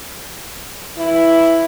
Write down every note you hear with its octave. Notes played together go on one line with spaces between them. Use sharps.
E3 E4